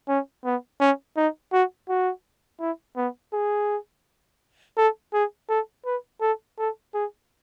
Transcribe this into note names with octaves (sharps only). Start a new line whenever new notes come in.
C#4
B3
C#4
D#4
F#4
F#4
E4
B3
G#4
A4
G#4
A4
B4
A4
A4
G#4